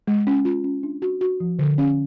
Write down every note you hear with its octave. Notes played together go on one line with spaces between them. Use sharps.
G#3
C#4
F4
C#4
D4
F#4
F#4
F3
D3
C#4